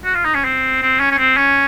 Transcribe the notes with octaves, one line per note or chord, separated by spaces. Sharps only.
F#4
F4
D#4
C#4
C4
C4
C#4
C#4
C4
C#4